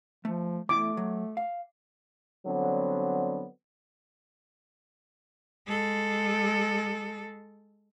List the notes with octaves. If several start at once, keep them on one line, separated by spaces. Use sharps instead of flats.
F3 A3
E2 A3 E4 D6
F#3
F5
D3 F#3 G3 B3 C4
G#3 A4